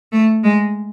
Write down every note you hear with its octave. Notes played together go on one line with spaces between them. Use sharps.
A3
G#3